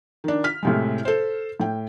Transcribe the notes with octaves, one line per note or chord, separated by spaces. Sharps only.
D#3 D4
F6 B6
A2 C3 G#3
A4 C5
A2 G5